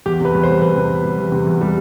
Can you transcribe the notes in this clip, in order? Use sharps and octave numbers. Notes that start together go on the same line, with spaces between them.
E2 G4
C3 B4
E2
C5
G3
E2 B4
C3
E2
G3
E2
C3
E2
G3